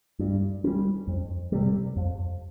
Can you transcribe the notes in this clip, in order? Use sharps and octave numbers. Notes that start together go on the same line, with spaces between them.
G2
G3 C#4
F2
C3 G3
F2